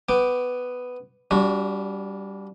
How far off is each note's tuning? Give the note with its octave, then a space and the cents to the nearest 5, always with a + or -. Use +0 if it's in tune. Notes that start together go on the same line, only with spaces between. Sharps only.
B3 +5 G5 +0 D6 +0
G3 +0 D4 -40 F#4 -10